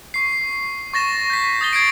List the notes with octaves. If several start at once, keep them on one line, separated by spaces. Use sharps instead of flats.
C#6 C7
C#6 A6 A#6 E7
G6 B6
D#6 A6 G7
G#6 C7 D7